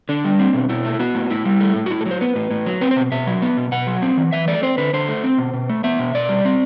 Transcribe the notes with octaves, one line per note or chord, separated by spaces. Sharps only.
D3 D4
G3
C4
B2
B2 E4
A3
B3 F#4
A2
A2 E4
G3
A3
A2
F#4
A2 E4
A4
F#3
C5
B3 B4
A2
A2
F#3
C4 B4
C5
B2
B2 E5
F#3
B3
B2
B2 F#5
F#3
C4
E3
E3 E5
A3 D5
C4 C5
D3 B4
D3 C5
A3
C4
B2
B2
A3
B3 E5
B2
B2 D5
G3
C4